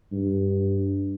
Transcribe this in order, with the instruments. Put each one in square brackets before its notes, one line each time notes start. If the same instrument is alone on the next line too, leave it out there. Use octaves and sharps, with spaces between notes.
[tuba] G2